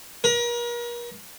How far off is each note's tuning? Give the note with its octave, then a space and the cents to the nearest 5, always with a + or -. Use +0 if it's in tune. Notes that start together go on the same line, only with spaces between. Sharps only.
A#4 +40